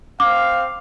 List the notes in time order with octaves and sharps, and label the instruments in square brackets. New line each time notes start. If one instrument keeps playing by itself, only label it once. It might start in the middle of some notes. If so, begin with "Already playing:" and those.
[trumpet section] C4 F5 [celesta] D6